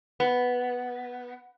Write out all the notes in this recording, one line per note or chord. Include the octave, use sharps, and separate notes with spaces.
B3